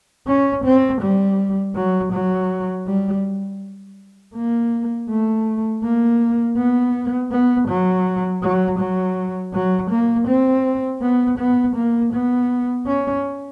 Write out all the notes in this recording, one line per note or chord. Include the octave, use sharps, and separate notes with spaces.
C#4
C4
G3
F#3
F#3
G3
A#3
A3
A#3
B3
B3
F#3
F#3
F#3
F#3
A#3
C4
B3
B3
A#3
B3
C#4